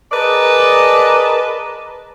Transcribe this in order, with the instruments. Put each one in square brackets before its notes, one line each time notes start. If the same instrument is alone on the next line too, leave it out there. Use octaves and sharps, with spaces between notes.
[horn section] G#4 A#4 B4 D5 D#5 A5